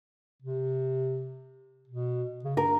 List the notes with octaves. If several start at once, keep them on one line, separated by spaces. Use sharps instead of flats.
C3
B2
C#3
G2 A#4